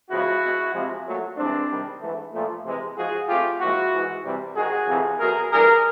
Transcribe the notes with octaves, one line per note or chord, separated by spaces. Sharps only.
E2 C#3 F3 G#3 E4 F#4
B2 G#3
C3 F3 G#3
A#2 F#3 A3
G2 E3 G#3 C4 D4
C3 D#3 G3
G#2 E3 A3
A#2 F3 A3
C3 E3 G#3
G#2 F3 G#3 F#4 G#4
F2 C3 F3 A3 F4 G4
A#2 F3 G#3 E4 F#4
G#2 E3 G#3
C3 E3 G3
G#2 D#3 G#3 F#4 G#4
F2 C3 E3 A3
B2 F#3 A3 G#4 A#4
G2 E3 G3 G#4 A#4